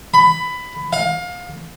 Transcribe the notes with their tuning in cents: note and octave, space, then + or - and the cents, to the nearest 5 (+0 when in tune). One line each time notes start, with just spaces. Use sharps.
B5 +15
F5 +30